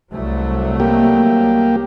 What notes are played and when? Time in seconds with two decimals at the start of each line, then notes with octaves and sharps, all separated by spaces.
0.13 C2 F#3 A3
0.80 A#3 G4